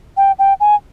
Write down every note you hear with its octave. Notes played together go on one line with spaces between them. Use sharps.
G5
G5
G#5